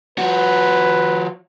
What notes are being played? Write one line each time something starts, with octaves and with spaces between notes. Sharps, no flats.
F3 F#4 B4